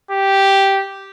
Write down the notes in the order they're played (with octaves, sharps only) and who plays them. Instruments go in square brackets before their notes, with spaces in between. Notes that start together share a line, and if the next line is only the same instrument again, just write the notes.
[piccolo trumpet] G4